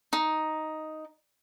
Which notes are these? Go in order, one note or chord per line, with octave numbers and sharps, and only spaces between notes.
D#4